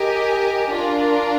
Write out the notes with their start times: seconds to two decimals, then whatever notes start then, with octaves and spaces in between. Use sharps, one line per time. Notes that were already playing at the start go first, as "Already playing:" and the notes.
Already playing: G4 A#4 D#5 G#5
0.70 D4 F4 A#4